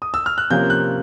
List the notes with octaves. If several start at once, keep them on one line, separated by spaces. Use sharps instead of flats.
D#6
E6
F6
F#6
C3 F3 A#3 C#4 G6
F#6